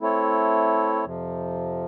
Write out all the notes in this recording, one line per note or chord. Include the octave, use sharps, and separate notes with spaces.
A3 C4 E4 A4 C#5
F2 C3 F3